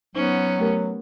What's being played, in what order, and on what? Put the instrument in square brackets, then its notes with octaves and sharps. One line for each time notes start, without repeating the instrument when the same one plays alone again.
[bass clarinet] F#3 [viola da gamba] B3 C#4 [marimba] D#4 C5
[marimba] A3 G4 A#4